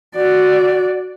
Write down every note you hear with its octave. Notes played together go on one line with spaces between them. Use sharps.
F#4 D5